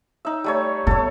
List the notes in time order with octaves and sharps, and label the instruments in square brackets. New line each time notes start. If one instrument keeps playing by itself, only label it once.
[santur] D#4 E5
G3 A3 C#5
[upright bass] B3 [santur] A4 C#5